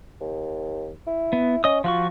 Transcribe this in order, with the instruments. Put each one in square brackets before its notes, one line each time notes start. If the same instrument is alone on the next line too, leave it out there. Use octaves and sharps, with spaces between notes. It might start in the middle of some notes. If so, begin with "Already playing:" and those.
[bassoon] D#2
E4
[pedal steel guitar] B3
[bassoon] C#4 [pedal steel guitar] D#5 D#6
[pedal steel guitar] F3 F#4 C#6 [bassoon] F4